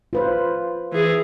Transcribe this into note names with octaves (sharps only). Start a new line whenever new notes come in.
F4 B4 C5
E3 G#4